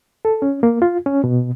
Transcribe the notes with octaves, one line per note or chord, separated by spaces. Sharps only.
A4
C#4
A#3
F4
C#4
B2